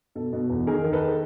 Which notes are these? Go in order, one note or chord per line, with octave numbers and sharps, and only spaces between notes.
B2 A4
B2
E2
D#3 G#4 A#4
D#3
A4 B4